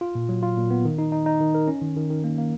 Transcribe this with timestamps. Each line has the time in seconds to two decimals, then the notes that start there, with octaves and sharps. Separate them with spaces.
0.01 F4
0.15 A#2
0.29 F#3
0.43 F4
0.57 A#2
0.70 B3
0.85 D#3
0.98 D#4
1.12 D#4
1.26 D#4
1.40 D#3
1.55 A#4
1.68 C#4
1.82 D#3
1.96 D#3
2.10 D#3
2.24 A#3
2.38 A#3